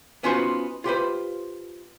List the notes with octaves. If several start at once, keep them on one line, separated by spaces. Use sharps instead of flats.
B3 C#4 D#4 F4 F#4 C5
F4 G4 B4 C5